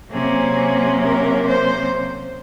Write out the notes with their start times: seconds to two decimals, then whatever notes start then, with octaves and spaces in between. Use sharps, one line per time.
0.11 C3 F#3 A#3 C#4 G#4
1.01 A#4
1.46 C5